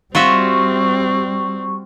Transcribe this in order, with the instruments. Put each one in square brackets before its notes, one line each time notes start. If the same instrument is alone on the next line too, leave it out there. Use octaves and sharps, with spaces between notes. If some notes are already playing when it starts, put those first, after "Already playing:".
[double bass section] G3 [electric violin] C4 [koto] F4 F#4 E5 [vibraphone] C#6